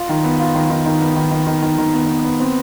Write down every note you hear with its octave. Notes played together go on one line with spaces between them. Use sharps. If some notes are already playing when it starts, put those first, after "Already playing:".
Already playing: F4
D#3
B3
F4
D#3
D#3
D#3
B3
D#3
D#3
D#3
D#3
D#3
B3
B3
B3
C4